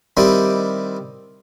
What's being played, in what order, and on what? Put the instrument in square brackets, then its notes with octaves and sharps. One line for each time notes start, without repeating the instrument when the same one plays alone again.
[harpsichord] D#3 G3 C4 E4 G4 D#5